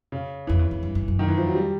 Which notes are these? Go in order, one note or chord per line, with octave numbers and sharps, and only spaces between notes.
C#3
F2 E3
E2
F2
G2
G2
F#2
D#3
E3
F3
F#3
G3